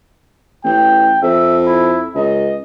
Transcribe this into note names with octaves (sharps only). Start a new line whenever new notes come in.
A1 G5
F2 E5
E4
C#2 D#5